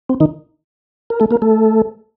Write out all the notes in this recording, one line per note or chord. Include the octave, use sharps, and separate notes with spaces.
C4
D#3 D#4
A#4
A3 A4
A#3 A#4
A3 A4